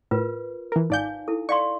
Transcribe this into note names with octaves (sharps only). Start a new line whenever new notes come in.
A2 F4 A#4 B4
E3 A#4
G#1 D#4 D5 F5 G#5 G6
E4 A4
D5 F5 C6 C#6